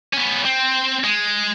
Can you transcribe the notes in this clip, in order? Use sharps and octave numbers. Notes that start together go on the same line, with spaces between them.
B3 C#4
C4
G#3